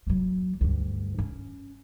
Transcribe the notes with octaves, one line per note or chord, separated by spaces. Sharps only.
F#3 A#3
D2 G2
C#4